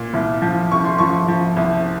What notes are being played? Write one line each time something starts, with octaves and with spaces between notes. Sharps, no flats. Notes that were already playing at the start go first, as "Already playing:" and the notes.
Already playing: A#2
C2
F3
C2 C#6
C6
F3 C#6
F3
C2